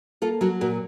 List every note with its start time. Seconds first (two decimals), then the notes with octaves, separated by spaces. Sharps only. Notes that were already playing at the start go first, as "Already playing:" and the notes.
0.22 A#3 F4 A4
0.41 F#3 F#4 A#4
0.61 A#2 F#4 A#4